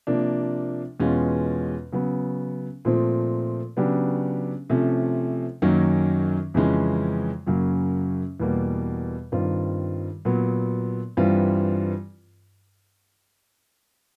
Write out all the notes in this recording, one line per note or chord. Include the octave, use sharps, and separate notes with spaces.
C3 F3 A#3 D4
E2 B2 G#3 C#4 F4
C#3 F#3 B3
A#2 F3 A3 C4
C#3 F#3 B3 D4 G4
C3 F3 A3 C#4
F#2 D#3 F#3 A#3 C#4
F2 C#3 E3 G#3 C#4
F#2 C#3 F#3 A#3
E2 B2 G3 A#3
G2 D#3 G3 C4 F4
A#2 F#3 B3
G2 E3 G3 C4 F4